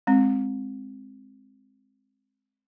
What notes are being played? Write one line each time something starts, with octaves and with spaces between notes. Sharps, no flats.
G#3 C4